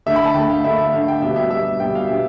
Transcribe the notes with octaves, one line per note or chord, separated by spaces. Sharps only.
D3 A3 E5
B5
A5
D3 A3 G5
F5
D3 A3 E5
E5
D3 A3 F5
G5
B2 G3 E5
E5
B2 G3 E5
B2 G3 G5
F5
B2 G3 E5